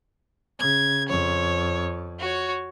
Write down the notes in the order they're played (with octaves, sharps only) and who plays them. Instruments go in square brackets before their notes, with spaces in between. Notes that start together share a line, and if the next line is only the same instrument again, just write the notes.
[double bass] C#3 [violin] G#6
[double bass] F2 [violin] C#5
[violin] F#4 C#5